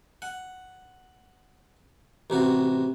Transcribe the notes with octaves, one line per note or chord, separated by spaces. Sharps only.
F#5
A1 C3 F#4